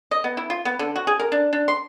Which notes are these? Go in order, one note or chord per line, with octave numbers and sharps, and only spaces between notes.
D#5
B3
E4
F4
B3
D3
F#4
G#4
A#4
D4
D4
C6